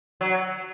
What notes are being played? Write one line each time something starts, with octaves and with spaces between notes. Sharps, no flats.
F#3